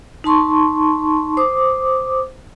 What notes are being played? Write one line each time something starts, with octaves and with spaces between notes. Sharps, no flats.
D#4 A5 C6 C#6
C5 D6 D#6